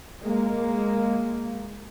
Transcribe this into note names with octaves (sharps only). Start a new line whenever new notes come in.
G#3 A#3